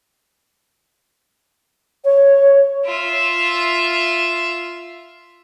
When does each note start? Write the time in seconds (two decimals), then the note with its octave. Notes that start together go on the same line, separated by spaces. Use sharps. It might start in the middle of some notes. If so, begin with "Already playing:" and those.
2.04 C#5
2.86 F4 E5